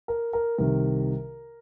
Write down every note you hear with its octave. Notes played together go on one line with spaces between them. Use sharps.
A#4
A#4
C2 C3 D#3 A#4